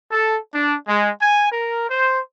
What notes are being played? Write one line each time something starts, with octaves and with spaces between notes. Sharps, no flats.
A4
D4
G#3
G#5
A#4
C5